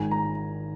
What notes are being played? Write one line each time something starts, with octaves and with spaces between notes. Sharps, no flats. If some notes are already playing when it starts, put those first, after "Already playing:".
Already playing: G#1 G#2 D#3 G#5
A#5